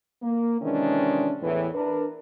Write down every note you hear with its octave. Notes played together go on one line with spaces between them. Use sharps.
A#3
C3 D#3 E3 G#3 C#4 D4
E2 A2 E3
D4 A#4 B4